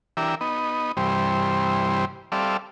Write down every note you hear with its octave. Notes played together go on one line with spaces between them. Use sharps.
E3 D4 G4 A#4 E5
B3 D#4
G2 C3 E3 G3 C5
G3 C4 A4 D5 E5 F5